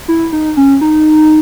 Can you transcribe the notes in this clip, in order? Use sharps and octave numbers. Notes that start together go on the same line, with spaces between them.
E4
D#4
C#4
D#4